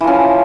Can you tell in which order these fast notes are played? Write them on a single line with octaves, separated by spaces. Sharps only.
E3 F3 C#4